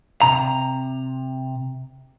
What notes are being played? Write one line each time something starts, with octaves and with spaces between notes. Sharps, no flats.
C3 A#5